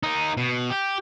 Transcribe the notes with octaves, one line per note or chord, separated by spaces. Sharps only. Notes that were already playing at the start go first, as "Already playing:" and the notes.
A#3 D#4
B2
G4